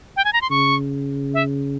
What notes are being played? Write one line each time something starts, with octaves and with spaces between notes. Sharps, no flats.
G5
G#5
A#5
C6
C#3 C#6
E5